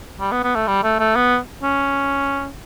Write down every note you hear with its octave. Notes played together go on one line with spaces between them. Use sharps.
G3
B3
B3
A3
G3
A3
A3
B3
C#4